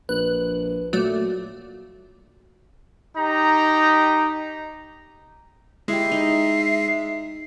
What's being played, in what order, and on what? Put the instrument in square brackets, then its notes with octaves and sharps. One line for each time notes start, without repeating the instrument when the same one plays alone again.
[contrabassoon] A#1 [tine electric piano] B4 [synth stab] F#6
[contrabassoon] A#2 [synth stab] F#3 A3 D5 [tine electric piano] F#4
[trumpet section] D#4 G4 A#5
[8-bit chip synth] G#3 [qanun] E4 G4 [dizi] E5 [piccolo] C7
[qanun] D#4